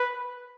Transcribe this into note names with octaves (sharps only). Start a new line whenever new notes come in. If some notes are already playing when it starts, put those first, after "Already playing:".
Already playing: B4